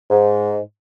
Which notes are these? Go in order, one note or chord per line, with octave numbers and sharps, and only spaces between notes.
G#2